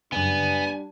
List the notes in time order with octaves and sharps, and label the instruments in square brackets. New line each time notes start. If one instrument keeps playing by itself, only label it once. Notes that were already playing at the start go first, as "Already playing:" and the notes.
[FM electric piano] F#2 C#3 [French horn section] G3 D4 [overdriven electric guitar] B3 [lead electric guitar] G#5